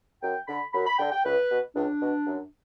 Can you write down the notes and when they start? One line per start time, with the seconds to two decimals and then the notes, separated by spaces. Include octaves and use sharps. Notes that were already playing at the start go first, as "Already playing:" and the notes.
0.23 F#2 G5
0.48 D3 B5
0.73 F#2 B5
0.86 B5
0.99 D3 G5
1.12 G5
1.25 C#2 B4
1.50 B2
1.75 C#2 D4
2.01 B2
2.27 F#2